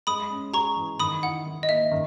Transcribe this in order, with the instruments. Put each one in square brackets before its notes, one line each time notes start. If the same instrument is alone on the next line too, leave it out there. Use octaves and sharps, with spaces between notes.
[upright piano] G#3 [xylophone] B5 D#6
[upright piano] C#4
[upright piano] G#4 [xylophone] A#5 C#6
[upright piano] E3
[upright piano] D#3 [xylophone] B5 D#6
[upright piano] E4 [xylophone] F#5
[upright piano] D#3
[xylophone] D#5
[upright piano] A#3 [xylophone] E5
[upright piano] D#3